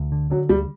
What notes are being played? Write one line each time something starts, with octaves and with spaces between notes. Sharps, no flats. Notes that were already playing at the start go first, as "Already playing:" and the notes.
Already playing: D2
D3
D3 F#3
D2 G3